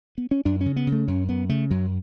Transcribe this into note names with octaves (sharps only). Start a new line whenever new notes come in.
B3
C#4
F#2 D4
C#4
C#3
B3
C#3
A3
F#2 C#4
F#2 B3
C#3 A3
F#2 F#3